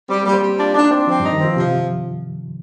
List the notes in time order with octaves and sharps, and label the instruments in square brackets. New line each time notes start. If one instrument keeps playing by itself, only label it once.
[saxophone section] G3 [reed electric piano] C4
[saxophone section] G3 [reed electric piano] A#3
[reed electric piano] C4
[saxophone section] G3
[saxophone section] D4 [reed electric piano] F4
[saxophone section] D4 [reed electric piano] D#4
[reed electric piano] C4 [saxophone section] D4
[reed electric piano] F3 [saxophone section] C4
[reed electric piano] G2
[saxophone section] D#4
[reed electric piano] D#3
[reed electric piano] F3 [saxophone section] C4
[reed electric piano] C3 [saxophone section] F3